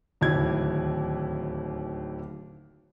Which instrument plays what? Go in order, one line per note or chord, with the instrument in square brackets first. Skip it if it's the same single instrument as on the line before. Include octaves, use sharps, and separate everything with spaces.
[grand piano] D1 D#2 E4 G#6